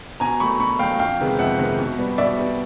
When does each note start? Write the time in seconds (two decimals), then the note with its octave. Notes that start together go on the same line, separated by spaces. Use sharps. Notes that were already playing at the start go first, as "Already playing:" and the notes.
0.20 B2 G#5 A#5
0.40 F#3 A3 B5 C#6
0.60 B2 B5 C#6
0.79 F#3 A3 F5 G5
0.99 F2 F5 G5
1.20 C3 D#3 G#3 B3
1.39 F2 E5 F#5
1.58 C3 D#3 G#3 B3
1.79 B2
1.98 G3 B3
2.18 B2 D5 E5
2.38 G3 B3